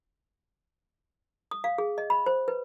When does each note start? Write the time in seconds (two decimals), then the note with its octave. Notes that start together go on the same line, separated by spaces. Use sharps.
1.51 D#6
1.64 F5
1.78 G#4
1.98 D#5
2.10 B5
2.26 C5
2.48 B4